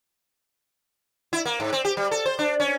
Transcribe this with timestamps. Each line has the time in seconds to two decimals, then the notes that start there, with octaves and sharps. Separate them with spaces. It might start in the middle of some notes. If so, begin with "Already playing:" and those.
1.33 E4
1.45 A#3
1.60 G#2
1.73 C4
1.85 G4
1.97 G3
2.11 A4
2.26 C5
2.39 D4
2.60 C#4